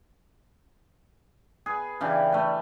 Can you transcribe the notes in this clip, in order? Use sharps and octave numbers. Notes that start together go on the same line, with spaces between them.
G#4 B4
C#3 E3 D4 G4
A3 D4 B4